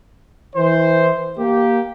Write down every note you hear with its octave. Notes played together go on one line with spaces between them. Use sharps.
E3 C5
A#3 G4